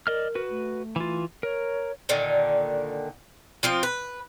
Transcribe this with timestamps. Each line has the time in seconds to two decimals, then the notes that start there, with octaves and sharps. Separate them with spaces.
0.07 A#4 D5 D#5 F6
0.35 F#4 B4
0.50 A3
0.96 E3 F4
1.43 A#4 C#5
2.09 A#2 D3 D#3
3.63 F3 C4 F4
3.83 B4